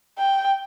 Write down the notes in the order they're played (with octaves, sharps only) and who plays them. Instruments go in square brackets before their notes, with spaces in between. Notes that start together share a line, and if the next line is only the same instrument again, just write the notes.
[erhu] G5